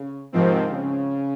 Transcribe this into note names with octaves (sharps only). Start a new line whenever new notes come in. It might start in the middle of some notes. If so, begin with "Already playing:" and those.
Already playing: C#3
G#2 C3 D#3 F3 C4
C#3